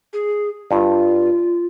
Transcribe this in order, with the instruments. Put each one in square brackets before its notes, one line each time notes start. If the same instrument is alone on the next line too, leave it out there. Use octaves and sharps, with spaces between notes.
[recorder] G#4
[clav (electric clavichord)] G2 [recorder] F4